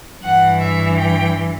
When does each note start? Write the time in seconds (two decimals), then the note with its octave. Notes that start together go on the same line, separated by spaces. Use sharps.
0.23 G2 E3 F#5
0.61 E5
0.98 G5